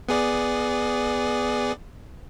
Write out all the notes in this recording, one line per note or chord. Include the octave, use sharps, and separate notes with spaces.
B3 G#4 D5